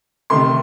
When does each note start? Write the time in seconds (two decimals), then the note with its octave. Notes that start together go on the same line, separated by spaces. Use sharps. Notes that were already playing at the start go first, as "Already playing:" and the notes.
0.30 C3 D#3 A3 C6